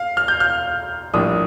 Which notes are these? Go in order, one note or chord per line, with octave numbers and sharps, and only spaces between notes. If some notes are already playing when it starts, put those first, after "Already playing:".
Already playing: F5
F6
G6
F6
A#1 A2 G3 A#3 D4 D#6